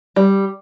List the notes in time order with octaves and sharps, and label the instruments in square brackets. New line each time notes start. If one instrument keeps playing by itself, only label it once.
[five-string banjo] G3